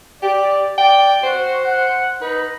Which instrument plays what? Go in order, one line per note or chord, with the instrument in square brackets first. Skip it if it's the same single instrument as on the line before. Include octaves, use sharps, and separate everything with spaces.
[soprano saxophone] G4 [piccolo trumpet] D5
[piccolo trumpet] D5 [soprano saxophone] G5
[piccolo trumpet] F#4 [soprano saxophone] C5
[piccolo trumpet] F#5
[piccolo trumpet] D#4 [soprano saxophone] B4